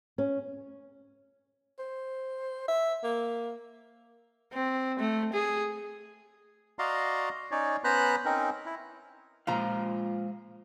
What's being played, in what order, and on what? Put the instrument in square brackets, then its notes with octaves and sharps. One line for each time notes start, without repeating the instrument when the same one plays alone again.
[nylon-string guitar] C#4
[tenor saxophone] C5
E5
A#3
[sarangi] C4
A3
G#4
[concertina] F#4 D5 D#5 F5 A#5 C6
C#4 D#4 C#5 D5
B3 C#4 C5 A#5 B5 F#6
C4 C#4 D#4 A#4
E4
[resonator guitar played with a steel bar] A#2 F3 A#5 [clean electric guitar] G#3 C5 F5